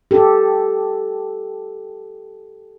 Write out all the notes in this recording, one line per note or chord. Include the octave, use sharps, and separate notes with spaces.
G4 A4